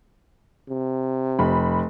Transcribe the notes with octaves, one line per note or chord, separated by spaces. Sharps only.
C3
F1 B5